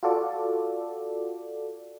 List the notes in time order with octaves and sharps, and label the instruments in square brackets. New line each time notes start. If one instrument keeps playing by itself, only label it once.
[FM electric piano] F4 F#4 A4 D5